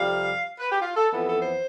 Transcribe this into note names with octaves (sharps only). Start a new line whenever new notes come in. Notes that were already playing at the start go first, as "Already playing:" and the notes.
Already playing: F2 C3 G3 F5
B4
G4
F4
A4
F2 E3 B3 A4
A4
C5